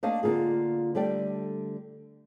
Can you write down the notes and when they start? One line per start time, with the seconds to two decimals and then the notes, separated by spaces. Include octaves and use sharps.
0.03 A3 A#3 D4 D#5 F5 A5
0.23 D3 A#3 F4 G#4
0.95 D3 G3 A3 D5 G5